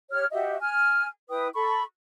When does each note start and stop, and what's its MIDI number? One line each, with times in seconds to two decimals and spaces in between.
0.11 0.26 67
0.11 0.26 73
0.11 0.26 89
0.32 0.57 66
0.32 0.57 67
0.32 0.57 75
0.32 0.57 76
0.61 1.06 80
0.61 1.06 89
1.30 1.47 64
1.30 1.47 71
1.30 1.47 79
1.30 1.47 87
1.55 1.83 69
1.55 1.83 83
1.55 1.83 85